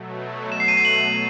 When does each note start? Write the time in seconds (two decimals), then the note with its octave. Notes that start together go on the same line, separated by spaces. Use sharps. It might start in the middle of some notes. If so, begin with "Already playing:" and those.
Already playing: B2 F#3 A3
0.52 E7
0.60 C7
0.68 D#7
0.77 C7
0.85 F#7